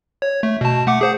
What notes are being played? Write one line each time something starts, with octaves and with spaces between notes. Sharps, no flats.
C#5
A3
B2 A5
A3 F#5 D6
G#4 C5 F#5